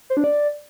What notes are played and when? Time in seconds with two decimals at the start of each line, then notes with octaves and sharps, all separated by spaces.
0.10 C5
0.17 D4
0.24 D5